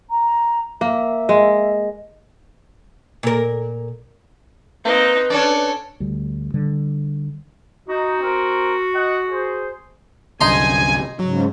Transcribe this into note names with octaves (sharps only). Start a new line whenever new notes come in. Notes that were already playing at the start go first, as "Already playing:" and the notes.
A#5
A#3 E5
G#3
A#2 A#4
A#3 C4 D#4 B4
C#4 D4 A4 D5
D2 G3
D3 G3
D#4 F#4
C4 A#4
D#5 F#5
G#4 C5
C2 F#2 D3 D#4 G#5 A#5 C6
G#2 C#3 F#3